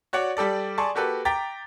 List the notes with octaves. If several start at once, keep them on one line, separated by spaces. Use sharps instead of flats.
F#4 C#5 D5 F#5
G3 G4 A4 D5
G#4 D5 A5 C6 C#6
A#3 F#4 G4 A4 B4
G5 A#5 D6 A6 B6